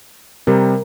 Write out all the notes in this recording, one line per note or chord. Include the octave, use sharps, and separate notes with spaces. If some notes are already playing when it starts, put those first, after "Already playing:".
C3 G3 A#4